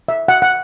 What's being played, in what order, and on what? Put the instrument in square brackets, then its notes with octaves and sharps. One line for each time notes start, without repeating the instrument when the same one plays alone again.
[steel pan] E5
F#5
F#5